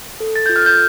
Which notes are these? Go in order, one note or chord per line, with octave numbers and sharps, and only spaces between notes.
A4
A6
F4 G6
F6
G6